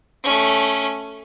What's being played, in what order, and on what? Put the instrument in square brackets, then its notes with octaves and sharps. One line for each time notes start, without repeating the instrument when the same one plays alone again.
[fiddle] A3 C#4